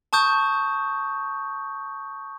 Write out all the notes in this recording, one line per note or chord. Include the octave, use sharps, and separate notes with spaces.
A5 C#6 D#6 G6